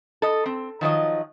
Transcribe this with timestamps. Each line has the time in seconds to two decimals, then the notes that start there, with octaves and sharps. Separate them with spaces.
0.22 A4 D#5
0.46 C4
0.81 D#3 F3 F#3 D#5